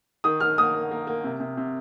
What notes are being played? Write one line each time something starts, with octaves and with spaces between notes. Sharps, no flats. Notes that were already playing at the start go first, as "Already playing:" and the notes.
D#3 D#6
D#3 F6
A#3 D#6
A#3
A#3
A#3
C3
C3
C3